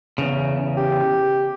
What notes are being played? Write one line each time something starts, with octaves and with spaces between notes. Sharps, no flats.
E2 C#3
G4